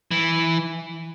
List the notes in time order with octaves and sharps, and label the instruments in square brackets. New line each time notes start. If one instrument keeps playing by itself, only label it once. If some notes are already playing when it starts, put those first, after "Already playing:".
[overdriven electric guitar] E3